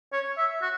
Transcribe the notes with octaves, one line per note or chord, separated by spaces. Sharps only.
C#5
E5
F#4